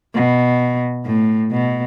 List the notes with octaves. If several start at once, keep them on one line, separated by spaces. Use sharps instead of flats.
B2
A2
B2